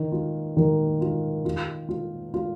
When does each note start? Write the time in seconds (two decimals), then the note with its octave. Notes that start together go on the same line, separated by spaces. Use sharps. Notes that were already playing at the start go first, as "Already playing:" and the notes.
Already playing: D#3
0.12 F4
0.57 D#3
1.01 F4
1.45 F4
1.89 F4
2.34 F4